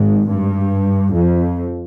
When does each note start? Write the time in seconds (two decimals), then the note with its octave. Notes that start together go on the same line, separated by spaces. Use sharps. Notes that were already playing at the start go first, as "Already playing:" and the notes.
Already playing: G#1 G#2
0.26 G2
1.14 F2